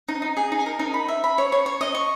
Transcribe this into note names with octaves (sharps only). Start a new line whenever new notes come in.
D#4
D#4
G#4
D#4
A#4
D#4
B5
E5
B5
C#5
C#5
C#5
D#5
C#6